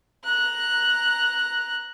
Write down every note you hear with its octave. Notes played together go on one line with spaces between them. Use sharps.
A#5 F#6